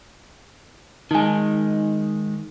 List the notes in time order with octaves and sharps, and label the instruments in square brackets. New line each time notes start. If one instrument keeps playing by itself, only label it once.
[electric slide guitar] D#3 G#3 [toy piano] D#4 G#5